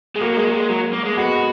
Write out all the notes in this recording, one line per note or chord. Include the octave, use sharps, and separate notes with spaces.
G#3
F#3 A#3
G#3
F#3
G#3
F#3
A#3
G#3
G#3 B3 F#4